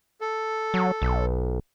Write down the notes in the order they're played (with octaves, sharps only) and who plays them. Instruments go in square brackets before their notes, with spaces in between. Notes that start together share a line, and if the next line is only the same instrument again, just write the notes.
[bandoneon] A4
[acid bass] F#3
B1